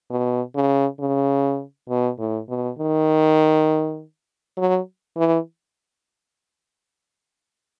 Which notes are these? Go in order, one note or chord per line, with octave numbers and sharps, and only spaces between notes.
B2
C#3
C#3
B2
A2
B2
D#3
F#3
E3